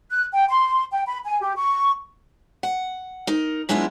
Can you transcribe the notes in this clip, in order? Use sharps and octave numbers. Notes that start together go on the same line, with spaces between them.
F#6
G5
C6
G5
B5
G#5
G4
C#6
F#5
D#4 A#4
F#3 G#3 B3 D4 E4 F4